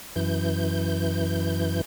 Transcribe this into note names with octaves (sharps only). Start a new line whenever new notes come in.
F#2 E3 G6